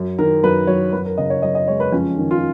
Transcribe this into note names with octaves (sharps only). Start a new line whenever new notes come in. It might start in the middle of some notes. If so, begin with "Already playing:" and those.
Already playing: F#2
D#3 A#4
F#2 B4
F#3 C#5
F#2 B4
A#4
C#3 D#5
C#5
F#2 D#5
D#5
G#3 C#5
B4
F2 C#4
D#3
F4